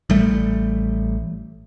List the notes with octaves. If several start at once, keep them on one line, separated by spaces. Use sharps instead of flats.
A1 G3 A3